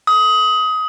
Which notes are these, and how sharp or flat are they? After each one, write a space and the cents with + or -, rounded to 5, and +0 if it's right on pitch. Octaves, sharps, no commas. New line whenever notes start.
D#6 +20